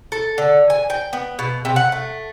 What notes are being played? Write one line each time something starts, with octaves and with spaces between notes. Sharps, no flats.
A4
D3
G#5
G5
B3
B2
C3
F#5
A3